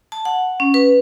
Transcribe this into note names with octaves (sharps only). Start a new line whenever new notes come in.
A5
F#5
C#4
B4